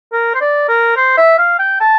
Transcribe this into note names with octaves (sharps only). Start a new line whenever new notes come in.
A#4
C5
D5
A#4
C5
E5
F5
G5
A5